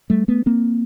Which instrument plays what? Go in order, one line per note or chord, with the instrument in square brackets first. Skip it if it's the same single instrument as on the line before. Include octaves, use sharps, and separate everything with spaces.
[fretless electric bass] G3 A3
A3 B3
A#3 C4